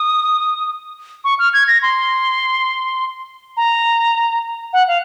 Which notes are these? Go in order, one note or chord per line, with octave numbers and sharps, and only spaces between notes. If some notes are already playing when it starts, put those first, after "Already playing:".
Already playing: D#6
C#6
F6
G#6
A#6
C6
A#5
F#5
F5